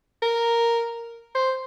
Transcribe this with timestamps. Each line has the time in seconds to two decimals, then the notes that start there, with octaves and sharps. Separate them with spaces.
0.22 A#4
1.35 C5